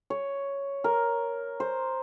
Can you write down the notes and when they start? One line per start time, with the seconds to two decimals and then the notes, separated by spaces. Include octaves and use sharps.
0.10 C#5
0.84 A#4
1.60 C5